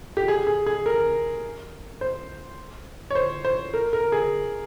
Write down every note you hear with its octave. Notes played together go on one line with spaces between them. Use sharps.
G4
G#4
G#4
G#4
A#4
C5
C#5
C5
C5
A#4
A#4
G#4